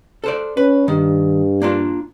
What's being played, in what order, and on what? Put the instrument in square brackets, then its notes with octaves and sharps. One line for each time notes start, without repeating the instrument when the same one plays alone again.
[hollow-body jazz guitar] A4 C5 D5
[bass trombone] C#4 [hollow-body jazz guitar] B4
[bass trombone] G2 [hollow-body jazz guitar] D#3
[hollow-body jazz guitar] A#3 D4 F4